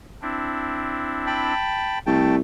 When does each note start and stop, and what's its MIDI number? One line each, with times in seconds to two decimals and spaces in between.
0.22 1.54 60
0.22 1.54 62
0.22 1.54 64
1.27 1.99 79
1.27 1.99 81
1.27 1.99 83
2.07 2.39 36
2.07 2.37 57
2.07 2.36 79
2.07 2.36 81